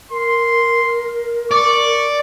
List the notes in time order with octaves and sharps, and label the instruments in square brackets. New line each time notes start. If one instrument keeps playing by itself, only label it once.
[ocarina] A#4 [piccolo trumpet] C6
[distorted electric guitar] D5 [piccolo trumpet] C#6